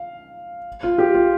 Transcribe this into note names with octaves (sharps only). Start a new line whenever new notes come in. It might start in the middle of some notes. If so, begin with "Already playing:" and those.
Already playing: F5
F4
G4
F4